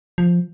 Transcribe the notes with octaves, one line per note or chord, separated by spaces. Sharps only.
F3